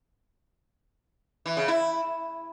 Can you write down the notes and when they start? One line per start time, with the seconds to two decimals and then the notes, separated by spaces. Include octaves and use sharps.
1.46 E3
1.57 C#3
1.68 E4